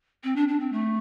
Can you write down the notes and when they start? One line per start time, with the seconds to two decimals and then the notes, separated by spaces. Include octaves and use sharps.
0.24 C4
0.36 D4
0.48 D4
0.60 C4
0.72 A3